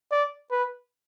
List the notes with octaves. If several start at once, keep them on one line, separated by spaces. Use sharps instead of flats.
D5
B4